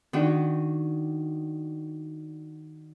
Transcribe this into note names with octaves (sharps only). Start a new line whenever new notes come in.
D#3 D4 F#4